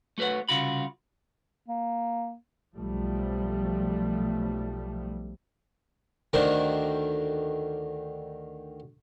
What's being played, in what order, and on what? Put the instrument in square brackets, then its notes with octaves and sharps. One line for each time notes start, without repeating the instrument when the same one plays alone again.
[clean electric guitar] A3 F#4 B4 C#5 F#5
C2 C#3 F4 F#4 B5
[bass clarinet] A#3
[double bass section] B1 F3 G3 A3
[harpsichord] D2 D#3 D4 A#4 C5